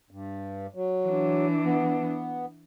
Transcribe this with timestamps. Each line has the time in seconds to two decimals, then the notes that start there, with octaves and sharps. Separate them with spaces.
0.11 G2
0.75 F#3
1.06 E3 D4
1.65 B3